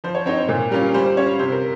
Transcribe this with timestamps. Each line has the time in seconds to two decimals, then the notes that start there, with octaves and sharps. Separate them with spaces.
0.04 F3 C5
0.15 C#5
0.26 C4 D#4 C#5
0.38 C5
0.49 A#2
0.71 G3 A#3 C#4 F4 A#4
0.94 G3 C5
1.06 C5
1.17 C#4 F4 C#5
1.27 F5
1.39 C3 C5
1.52 A#4